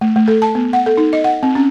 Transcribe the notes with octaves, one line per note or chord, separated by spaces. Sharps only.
A3
A3
A4
A5
B3
F#5
A4
D#4
D#5
F#5
C4
C#4